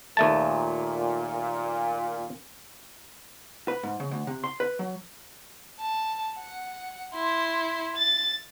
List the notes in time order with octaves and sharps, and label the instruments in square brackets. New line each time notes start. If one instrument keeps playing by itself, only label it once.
[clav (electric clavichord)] D#2 A3 A5 [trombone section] A#2
[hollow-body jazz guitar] B4
G#2
C#3
D2
C3
C6
B4
F#3
[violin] A5
F#5
E4 C6
A6